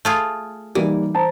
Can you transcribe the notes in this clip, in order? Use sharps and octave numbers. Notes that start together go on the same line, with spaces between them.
A3 F4 G#4
E3 G3 A#3 D#4
C5 A5 A#5